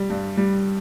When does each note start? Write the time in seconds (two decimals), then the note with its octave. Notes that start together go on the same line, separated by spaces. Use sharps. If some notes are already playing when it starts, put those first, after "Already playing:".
Already playing: G3
0.10 G2
0.37 G3